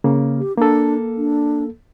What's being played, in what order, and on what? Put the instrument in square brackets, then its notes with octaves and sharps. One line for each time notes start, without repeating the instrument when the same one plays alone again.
[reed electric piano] C#3 A#3
[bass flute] G4
[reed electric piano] A#3 A4 [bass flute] D4
[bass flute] D4